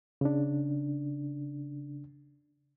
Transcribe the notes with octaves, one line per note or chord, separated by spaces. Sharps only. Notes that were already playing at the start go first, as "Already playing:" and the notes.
C#3 D4